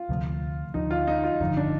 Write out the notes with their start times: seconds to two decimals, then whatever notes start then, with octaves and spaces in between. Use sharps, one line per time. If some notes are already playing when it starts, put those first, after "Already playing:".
Already playing: F4
0.09 D2 C3 F3 A3
0.74 D2 D3 F3 D#4
0.91 F4
1.08 D#4
1.24 F4
1.41 G1 F2 D3 F3 D#4
1.57 D4